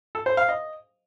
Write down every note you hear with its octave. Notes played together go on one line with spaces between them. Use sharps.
A4
C5
F5
D#5